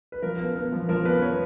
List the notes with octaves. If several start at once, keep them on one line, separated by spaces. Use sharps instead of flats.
B4
F3 A#4
B3
B3
F3
F3 A#4
B3 B4
B3 C#5